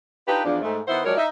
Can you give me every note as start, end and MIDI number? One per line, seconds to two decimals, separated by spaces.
0.26 0.43 62
0.26 0.43 63
0.26 0.43 65
0.26 0.43 67
0.26 0.43 71
0.45 0.58 40
0.45 0.58 53
0.45 0.58 62
0.62 0.80 44
0.62 0.80 57
0.88 0.99 51
0.88 0.99 59
0.88 0.99 64
0.88 0.99 72
0.88 0.99 78
1.05 1.15 53
1.05 1.15 54
1.05 1.15 56
1.05 1.15 70
1.05 1.15 73
1.05 1.15 74
1.17 1.27 63
1.17 1.27 76